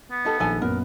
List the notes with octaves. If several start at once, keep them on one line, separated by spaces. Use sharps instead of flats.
B3
D#4 G4 A4
A#1 D#3 A4 G#5 A5
F#2 A#2 B3 A#4